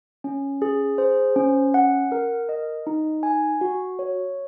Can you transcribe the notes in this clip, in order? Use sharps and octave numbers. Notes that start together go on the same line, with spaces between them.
C#4
G#4
C5
C#4
F#5
A#4
D#5
D#4
G#5
F#4
C#5